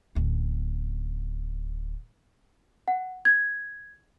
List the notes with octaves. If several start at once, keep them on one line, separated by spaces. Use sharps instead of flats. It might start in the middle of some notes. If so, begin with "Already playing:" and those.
D1 C#4
F#5
G#6